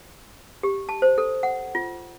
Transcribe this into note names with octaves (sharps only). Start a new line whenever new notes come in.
G4
A5
C5
A4
F#5
F4